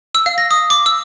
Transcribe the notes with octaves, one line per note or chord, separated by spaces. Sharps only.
E6
F5
A#6
D#6
D6
E6